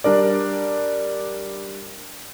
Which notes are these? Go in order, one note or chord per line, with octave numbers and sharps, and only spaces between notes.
G3 D4 A#4 D5